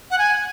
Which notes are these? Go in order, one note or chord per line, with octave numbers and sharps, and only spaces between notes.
F#5
G#5